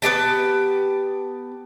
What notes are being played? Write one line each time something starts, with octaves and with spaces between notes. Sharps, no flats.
B3 C4 G4 A5